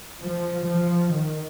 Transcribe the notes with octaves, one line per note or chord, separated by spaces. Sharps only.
F3
F3
D#3